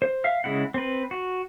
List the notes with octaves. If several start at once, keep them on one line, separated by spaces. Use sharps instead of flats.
C5
E5 F5 F6
C#3 G#3 E4 F#5
C4 B4
F#4